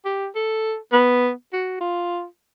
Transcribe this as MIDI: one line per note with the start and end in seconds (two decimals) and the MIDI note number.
0.05 0.28 67
0.36 0.76 69
0.92 1.31 59
1.53 1.76 66
1.81 2.25 65